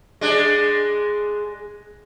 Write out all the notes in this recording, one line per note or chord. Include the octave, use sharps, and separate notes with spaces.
G#3 D4 G#4